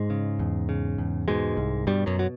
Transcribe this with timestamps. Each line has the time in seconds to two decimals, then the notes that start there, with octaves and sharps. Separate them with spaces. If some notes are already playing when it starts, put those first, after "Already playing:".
Already playing: G#2 G#3
0.10 C#3
0.39 E2
0.69 C#3
0.98 E2
1.28 G#2 B2 G#3
1.57 C2
1.87 G2 B2 G3
2.06 F#2 F#3
2.19 F#3